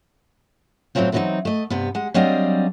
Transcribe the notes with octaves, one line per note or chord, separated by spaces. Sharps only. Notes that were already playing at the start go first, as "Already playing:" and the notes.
A2 C3 F3 F#3 C4 F4
D3 E3 F#3 G3 C4 D#4
A3 D#5
G2 C3 B3
G#3 F#5
F#3 G3 C4 D4 D#5 F5